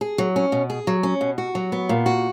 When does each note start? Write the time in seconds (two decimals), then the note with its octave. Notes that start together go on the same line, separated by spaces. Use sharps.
0.01 G#4
0.18 F#3
0.36 C#4
0.52 B2
0.70 G#4
0.87 F#3
1.03 C#4
1.21 B2
1.38 F#4
1.55 F#3
1.72 B3
1.89 A#2
2.06 F#4